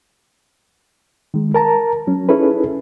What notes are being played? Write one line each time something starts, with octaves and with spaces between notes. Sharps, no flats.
D#3 G#3
A#4 A5 A#5
F#3 C#4
C#4 D#4 E4 G#4 A4 B4